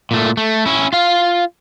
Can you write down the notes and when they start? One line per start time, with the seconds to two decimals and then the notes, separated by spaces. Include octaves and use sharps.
0.11 A#2 A3
0.37 A3
0.66 C#4 E4
0.93 F4 F5